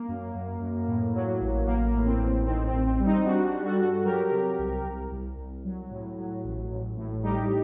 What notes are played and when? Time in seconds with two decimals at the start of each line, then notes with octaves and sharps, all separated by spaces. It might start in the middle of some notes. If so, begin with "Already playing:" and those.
Already playing: A#3
0.08 F#2
0.34 F#2
0.60 F#2
0.87 A2
1.14 F#3
1.41 A1
1.67 A1 A#3
1.94 A2
2.06 C4
2.19 A1
2.46 D#3 C4
2.67 C4
2.73 A1
2.86 C4
2.99 G3
3.06 C4 D#4
3.25 G3 D4 F#4
3.52 G3
3.65 F#4 A4
3.79 G2
4.05 F#3 G4 A#4
4.31 C3
4.59 C2
4.85 C2
5.12 C2
5.38 C2
5.64 F#3
5.91 A2
6.18 F#3
6.44 A1
6.71 A1
6.97 A2
7.23 G3 D#4 G4